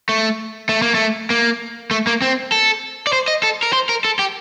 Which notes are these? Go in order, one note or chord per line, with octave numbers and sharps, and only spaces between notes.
A3
A3
A#3
A3
A#3
A3
A#3
C4
A4
D5
C5
D#5
A4
A#4
C5
A#4
A4
G4